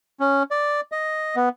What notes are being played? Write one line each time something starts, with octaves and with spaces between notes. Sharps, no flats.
C#4
D5
D#5
B3